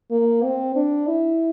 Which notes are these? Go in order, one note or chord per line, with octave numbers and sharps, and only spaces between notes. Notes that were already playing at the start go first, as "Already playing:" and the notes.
A#3
C4
D4
E4